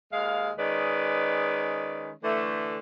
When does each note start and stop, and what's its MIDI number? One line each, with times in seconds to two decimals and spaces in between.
0.13 0.49 39
0.13 0.49 56
0.13 0.49 77
0.59 2.11 51
0.59 2.11 56
0.59 2.11 61
0.59 2.11 71
0.59 2.11 74
2.24 2.78 50
2.24 2.78 52
2.24 2.78 57